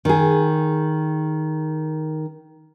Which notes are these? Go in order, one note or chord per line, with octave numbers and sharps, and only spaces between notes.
D#3 G#4